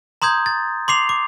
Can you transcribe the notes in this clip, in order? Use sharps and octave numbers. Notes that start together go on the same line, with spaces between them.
A#5 C6 D#6 G6 G#6
A6
C6 D6 C7 F7
D6